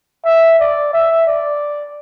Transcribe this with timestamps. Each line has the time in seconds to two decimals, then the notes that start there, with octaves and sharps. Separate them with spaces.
0.24 E5
0.59 D5
0.93 E5
1.27 D5